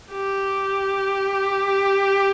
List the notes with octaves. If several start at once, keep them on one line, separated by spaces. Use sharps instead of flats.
G4